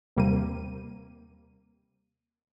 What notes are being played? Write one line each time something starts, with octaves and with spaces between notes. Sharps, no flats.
D#2 C3 G3 A#3 C4 D#7